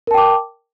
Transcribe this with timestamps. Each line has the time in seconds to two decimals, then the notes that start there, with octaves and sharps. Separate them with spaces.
0.07 A#4
0.11 A5
0.14 G5
0.18 D6